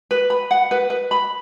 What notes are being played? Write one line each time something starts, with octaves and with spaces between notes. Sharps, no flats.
B4
B5
F#5
B4
B4
B5